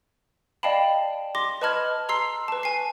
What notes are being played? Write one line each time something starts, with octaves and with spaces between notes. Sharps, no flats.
D5 D#5 F5 G5 A5 B5
C6 D6 A#6
B4 D#5 A5 B5 F6 G#6
A#5 C6 E6 C7
B4 A5
G#5 C7